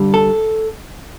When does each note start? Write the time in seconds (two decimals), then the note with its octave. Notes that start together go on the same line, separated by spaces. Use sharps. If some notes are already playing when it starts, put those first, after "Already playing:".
Already playing: G2 D3 G3
0.14 A4